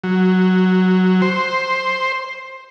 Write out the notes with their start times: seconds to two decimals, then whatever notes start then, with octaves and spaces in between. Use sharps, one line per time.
0.04 F#3
1.22 C5